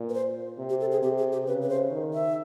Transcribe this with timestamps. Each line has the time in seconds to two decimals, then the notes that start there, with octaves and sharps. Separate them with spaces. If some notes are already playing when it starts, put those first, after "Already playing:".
Already playing: A#2
0.09 B4
0.14 C5
0.58 C3
0.69 G4
0.80 A4
0.92 G#4
1.03 C3 G4
1.18 G#4
1.32 G4
1.47 C#3 B4
1.62 B4
1.69 C5
1.91 D#3
2.13 E5